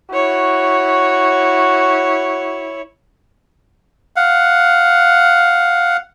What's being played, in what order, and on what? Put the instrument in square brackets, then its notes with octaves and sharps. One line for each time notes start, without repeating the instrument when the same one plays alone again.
[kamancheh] E4 C#5 [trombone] F#4
[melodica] F5 F#5